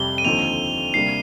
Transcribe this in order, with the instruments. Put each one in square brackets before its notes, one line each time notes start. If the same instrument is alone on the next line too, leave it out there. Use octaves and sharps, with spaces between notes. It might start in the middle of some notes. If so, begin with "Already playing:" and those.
Already playing: [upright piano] F2 C3 G3 [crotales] G7
[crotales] D#7
[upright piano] D#2 D3 F3 C4 D#4 [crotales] F7
[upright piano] C3 G3 A#3 D4 [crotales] C7